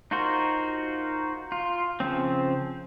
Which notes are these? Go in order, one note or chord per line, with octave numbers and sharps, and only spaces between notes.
D#4 F4 F#4 A#4 C5
F4
C#3 F3 C4